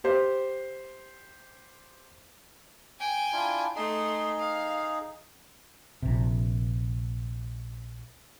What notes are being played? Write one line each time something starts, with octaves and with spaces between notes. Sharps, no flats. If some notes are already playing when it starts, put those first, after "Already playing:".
G4 C5
G5 G#5
D4 E4 F4
A3 D#4 G#4 C6
F5
A#1 C3